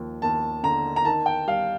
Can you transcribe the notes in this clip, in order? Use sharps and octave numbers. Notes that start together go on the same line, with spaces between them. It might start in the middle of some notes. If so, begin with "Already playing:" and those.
Already playing: D#2 F3
D#2 A5
D3 A#5
A#5
D#3 A5
G5
G3 F5